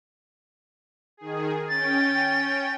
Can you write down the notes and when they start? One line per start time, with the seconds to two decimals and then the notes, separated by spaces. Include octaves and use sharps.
1.17 D#3 G#4
1.69 C#4 G5 A6